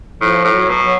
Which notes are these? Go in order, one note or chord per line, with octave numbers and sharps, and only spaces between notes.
A2 F3
A2
F#3
B2
F#3